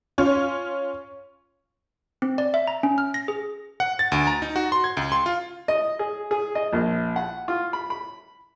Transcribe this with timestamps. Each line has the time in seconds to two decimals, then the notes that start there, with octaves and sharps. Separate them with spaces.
0.18 C#4 F4 C#5
2.22 C4
2.38 D5
2.54 E5
2.68 A#5
2.83 C#4
2.98 F6
3.14 A#6
3.28 G#4
3.80 F#5
3.99 A6
4.12 D2
4.27 A#5
4.42 D#4
4.56 F#4
4.72 C6
4.84 G#6
4.97 C#2
5.12 C6
5.26 F4
5.68 D#5
5.99 G#4
6.31 G#4
6.55 D#5
6.73 A#1
7.16 F#5
7.48 F4
7.73 B5
7.90 B5